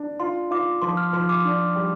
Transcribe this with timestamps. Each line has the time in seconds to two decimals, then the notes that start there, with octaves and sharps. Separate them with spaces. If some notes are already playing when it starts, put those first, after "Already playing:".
Already playing: D4
0.20 F4 C6
0.51 F4 D6
0.82 F3 C6
0.97 F6
1.13 F3 C6
1.29 D6
1.45 D4
1.75 G3